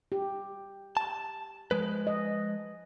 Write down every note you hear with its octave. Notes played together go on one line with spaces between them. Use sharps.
G4
A5
F3 G#3 B4
D#5